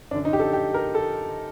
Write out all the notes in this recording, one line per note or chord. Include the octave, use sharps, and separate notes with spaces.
F#2 D3 D4
D#4
G4
A4
G4
A#4
A4